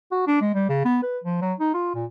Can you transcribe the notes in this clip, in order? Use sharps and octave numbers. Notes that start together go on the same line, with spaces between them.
F#4
D4
G#3
G3
C#3
B3
B4
F3
F#3
D#4
F4
A#2